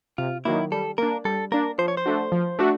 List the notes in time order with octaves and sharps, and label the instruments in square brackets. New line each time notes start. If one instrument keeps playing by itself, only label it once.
[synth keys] C3 [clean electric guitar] F4
[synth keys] D#3 F#3 A#3 [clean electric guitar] E4
[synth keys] G3 [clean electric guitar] A4
[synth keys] A#3 D4 [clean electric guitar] A#4
[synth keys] G3 [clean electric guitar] A4
[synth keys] A#3 D4 [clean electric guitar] A#4
[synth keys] F3 [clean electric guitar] C5
[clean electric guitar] C#5
C5
[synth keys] A3 D4 F#4
F3
A3 D4 F#4